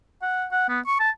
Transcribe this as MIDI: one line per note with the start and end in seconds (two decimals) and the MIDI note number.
0.22 0.46 78
0.52 0.66 78
0.69 0.80 59
0.86 0.98 85
1.00 1.10 81